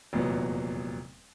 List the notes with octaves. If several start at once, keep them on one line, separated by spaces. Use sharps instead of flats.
F1 E2 A#2 F#3 B3